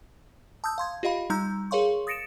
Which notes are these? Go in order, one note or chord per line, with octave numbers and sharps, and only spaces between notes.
A5 D#6 E6 G6
F5 C6 G#6
F4 G4 D#5 F5 B5
G3 D#4 A#5 E6 G6
G#4 A#4 C#5 F5 C6 C#6
D#6 A6 A#6 C#7 D7 E7